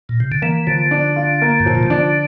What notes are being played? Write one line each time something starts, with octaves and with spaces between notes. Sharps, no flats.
A#2
C3
D3
E3 A#3
D3 F3
D4
F4
A#3
G2
A2 F3
A#2
C3
D3 D4